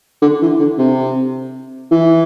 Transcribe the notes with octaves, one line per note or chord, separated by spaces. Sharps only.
D3
E3
D3
C3
E3